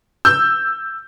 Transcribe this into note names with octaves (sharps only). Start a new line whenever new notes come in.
E6 G6